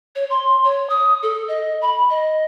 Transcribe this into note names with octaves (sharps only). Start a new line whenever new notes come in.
C#5
C6
C#5
D#6
A4
D#5
B5
D#5